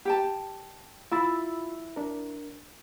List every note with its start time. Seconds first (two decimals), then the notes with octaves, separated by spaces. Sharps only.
0.05 G4 G5 A5
1.12 E4 F4 B5 E6 A6
1.96 D4 A#4